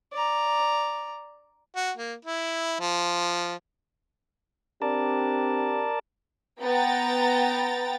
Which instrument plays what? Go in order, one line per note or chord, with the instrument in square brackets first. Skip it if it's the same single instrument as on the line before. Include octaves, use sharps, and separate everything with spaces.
[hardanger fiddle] D5 A#5
[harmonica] F#4
A#3
E4
F3
[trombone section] C4 D4 G4 [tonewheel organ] A#4 D5 A5
[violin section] B3 G5 A#5 A6